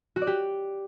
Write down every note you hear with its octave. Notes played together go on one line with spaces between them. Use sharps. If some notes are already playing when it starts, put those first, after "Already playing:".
F#4
D5
G4